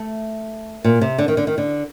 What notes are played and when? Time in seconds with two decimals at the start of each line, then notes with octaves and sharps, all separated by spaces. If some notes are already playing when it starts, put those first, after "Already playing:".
Already playing: A3
0.84 A#2
1.01 C3
1.18 D3
1.28 D#3
1.37 D3
1.47 D#3
1.58 D3